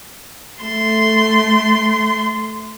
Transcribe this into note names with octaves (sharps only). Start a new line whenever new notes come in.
A3 C6